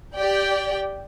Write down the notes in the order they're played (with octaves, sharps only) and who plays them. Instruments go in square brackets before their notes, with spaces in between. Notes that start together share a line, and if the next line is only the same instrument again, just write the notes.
[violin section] G4 D5 G5